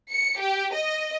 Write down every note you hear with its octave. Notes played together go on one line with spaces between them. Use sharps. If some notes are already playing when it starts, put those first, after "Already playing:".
C#7
G4
D#5